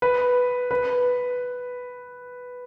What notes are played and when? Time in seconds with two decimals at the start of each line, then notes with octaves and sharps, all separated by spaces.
0.02 B4
0.71 B4